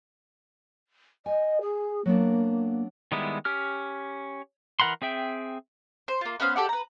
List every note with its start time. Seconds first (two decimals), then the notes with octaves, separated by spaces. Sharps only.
1.26 D#5 G#5
1.61 G#4
2.06 F#3 A#3 B3 D4
3.12 D#3 G3 G#3 B3 E4
3.45 C#4 G4 F6
4.80 E3 A#4 F#5 B5 C6
5.02 C4 G#4 E5 G5
6.08 C5
6.21 A#3 F4
6.40 B3 C#4 C5 F5
6.56 G4 A4 D5 F#5
6.69 B4 A#5